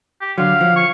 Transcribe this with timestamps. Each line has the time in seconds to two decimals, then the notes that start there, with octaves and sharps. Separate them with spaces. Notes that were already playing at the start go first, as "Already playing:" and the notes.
0.21 G4
0.38 D3 F#3 F5
0.61 F3
0.76 C#6